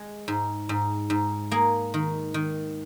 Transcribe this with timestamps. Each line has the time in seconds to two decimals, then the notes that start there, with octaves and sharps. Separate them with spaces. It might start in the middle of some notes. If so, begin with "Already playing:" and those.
Already playing: G#3
0.28 G#2
0.69 G#2
1.10 G#2
1.51 A#3 G#4
1.94 D#3
2.34 D#3